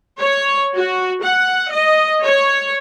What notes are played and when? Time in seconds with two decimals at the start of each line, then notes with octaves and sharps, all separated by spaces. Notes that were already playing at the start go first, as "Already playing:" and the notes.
0.19 C#5
0.76 F#4
1.24 F#5
1.73 D#5
2.24 C#5